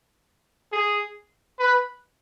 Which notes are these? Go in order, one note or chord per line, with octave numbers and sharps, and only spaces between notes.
G#4
B4